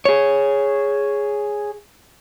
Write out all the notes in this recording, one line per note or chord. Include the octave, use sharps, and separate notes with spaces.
G#4 C#5